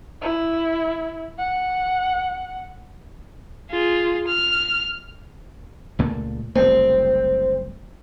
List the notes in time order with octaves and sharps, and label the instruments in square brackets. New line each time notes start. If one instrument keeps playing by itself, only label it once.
[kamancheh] E4
F#5
[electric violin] F4 G#4
F6
[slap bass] C#2 A#2 A3
[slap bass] F#1 C2 A3 [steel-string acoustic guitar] C4